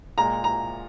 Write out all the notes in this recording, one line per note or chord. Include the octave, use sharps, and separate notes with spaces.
A#2 G#3 A#5
A#5